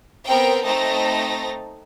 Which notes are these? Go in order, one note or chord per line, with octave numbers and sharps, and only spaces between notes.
B3 C4 A#4 G5
A3 C4 D#4 A5 A#6